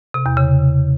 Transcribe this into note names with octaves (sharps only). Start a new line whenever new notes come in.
C3
E2
C#3